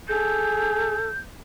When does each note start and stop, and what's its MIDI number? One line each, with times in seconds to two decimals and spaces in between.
0.08 0.97 68
0.08 1.09 69
0.08 1.19 91